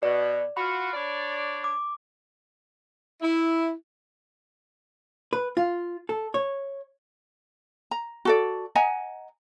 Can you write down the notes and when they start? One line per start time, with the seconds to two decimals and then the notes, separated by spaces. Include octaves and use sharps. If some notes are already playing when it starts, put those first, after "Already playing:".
0.03 B2 D5
0.57 F4 F#4 B5
0.94 D4 C#5 D5
1.64 D6
3.21 E4
5.33 B4
5.57 F4
6.09 A4
6.34 C#5
7.91 A#5
8.25 F#4 A4 D5
8.75 D#5 F#5 G#5 A#5